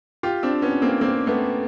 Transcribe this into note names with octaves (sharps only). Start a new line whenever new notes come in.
F4 G4
C4 D4
B3 C#4
A#3 C4
A#3 C4
A3 B3